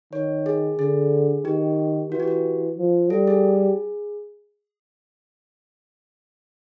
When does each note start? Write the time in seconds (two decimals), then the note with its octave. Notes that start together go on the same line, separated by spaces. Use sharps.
0.13 D#3 C#5
0.46 G#4
0.79 D3 G#4
1.45 D#3 G4
2.11 E3 F#4
2.20 G4
2.28 F#4
2.78 F3
3.10 G3 A4
3.27 G#4